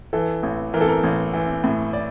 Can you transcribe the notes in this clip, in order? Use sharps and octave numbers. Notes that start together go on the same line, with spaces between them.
E3 A4
A1
E3 A#4
A4
A#4
A1
E3
A2
D5